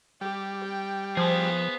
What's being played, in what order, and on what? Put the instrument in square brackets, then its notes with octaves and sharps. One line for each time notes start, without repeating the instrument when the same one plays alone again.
[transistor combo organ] G3 [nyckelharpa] G4
[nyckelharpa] G5
[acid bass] F3 [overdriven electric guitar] B3 G#4 [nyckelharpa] C5 F5